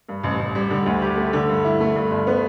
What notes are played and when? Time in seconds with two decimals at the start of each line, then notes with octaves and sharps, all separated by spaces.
0.09 G2
0.24 A1
0.40 A1
0.55 G3
0.70 D3
0.86 D2
1.02 G4
1.17 A3
1.33 D3
1.49 G2
1.65 E4
1.80 A3
1.95 G2
2.11 G1
2.27 B3